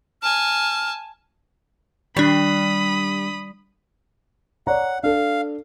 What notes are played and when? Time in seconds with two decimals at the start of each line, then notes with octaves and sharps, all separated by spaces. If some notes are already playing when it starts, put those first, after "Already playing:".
0.23 G#5 A5 F6
2.17 D#3 G3 D4 B5 D#6
4.67 C#5 D5 F#5 A#5
5.03 D4 A4 F5